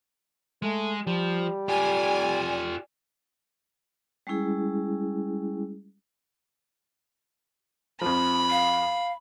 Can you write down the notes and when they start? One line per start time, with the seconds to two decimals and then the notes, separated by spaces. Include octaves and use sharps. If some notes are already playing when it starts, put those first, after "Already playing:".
0.62 G#3 A3
1.07 F3 G3
1.68 F4 G4 D5 G#5
4.27 G3 G#3 C#4 E4 G#4
8.01 F2 F3 B5
8.51 F5